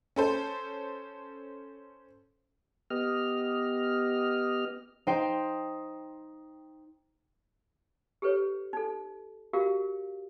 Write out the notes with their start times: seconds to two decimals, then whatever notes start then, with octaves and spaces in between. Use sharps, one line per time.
0.16 C#4 A4 C5
2.90 B3 G4 D#5 F6
5.07 D#4 C5 G5
8.22 G4 A4 B4 C#5
8.73 D#4 A4
9.53 F#4 G4 A#4 F5